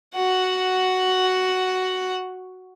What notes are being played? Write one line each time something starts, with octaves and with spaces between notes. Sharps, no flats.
F#4 F#5